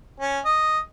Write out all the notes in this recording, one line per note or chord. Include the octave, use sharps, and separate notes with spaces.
C#4
D#5